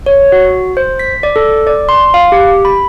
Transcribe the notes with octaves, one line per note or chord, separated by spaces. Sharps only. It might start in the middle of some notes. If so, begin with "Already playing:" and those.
C#5
F#4
C5
B6
D5
A4
D5
C6
F5
G4
B5